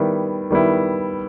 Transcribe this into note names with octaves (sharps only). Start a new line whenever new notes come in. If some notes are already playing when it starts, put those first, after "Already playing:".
Already playing: D#3 G3 B3 E4
D#3 G3 B3 E4